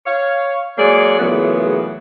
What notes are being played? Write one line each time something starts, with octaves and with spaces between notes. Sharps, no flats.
C#5 F5
F#3 G#3 A#3 G#4 C#5 D5
E2 A#2 C#3 F#3 A3 B3